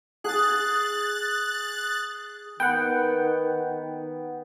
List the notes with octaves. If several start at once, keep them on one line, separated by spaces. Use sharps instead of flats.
G#4 F#6 A6
D#3 B3 F#5 G5